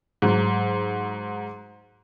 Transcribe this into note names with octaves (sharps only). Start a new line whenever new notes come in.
G#2 F#3